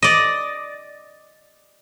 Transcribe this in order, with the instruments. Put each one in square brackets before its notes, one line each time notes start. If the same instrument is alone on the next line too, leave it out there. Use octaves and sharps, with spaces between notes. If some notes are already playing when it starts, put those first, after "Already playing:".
[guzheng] D5 D#5